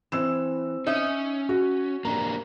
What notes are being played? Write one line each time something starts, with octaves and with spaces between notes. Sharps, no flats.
E3 C4 E6 E7
C#4 D#4 E5
F#4
A#3 D4 G4 A#5